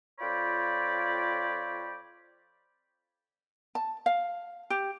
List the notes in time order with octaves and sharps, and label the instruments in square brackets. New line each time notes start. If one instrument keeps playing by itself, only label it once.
[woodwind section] F2 F4 C#5 D5 G5 B5
[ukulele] A5
F5
G4